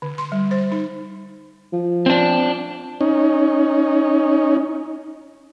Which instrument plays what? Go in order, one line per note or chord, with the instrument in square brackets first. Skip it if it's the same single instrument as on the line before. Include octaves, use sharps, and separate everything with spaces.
[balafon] D3
C6
G3
C5
D#4
[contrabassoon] F3
[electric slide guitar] C4 D4
[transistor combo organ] C#4 D#4